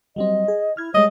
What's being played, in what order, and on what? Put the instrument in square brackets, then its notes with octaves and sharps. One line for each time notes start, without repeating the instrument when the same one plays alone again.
[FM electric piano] F#3 G3 C4 [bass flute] D#5
[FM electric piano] G#4
[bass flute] E4 [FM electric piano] F6 G#6
[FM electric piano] G3 G#3 [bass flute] C#5 [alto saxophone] D#5